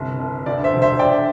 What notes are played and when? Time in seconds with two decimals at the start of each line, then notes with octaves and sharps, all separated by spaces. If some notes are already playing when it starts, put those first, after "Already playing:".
Already playing: G1 C2
0.19 G1
0.46 D2 D5
0.64 C5 E5
0.73 E1
0.82 C5 E5
0.99 D3 D5 G5